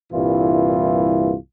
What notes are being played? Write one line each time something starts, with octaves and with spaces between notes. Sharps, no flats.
C2 G2 A#2 E3 F4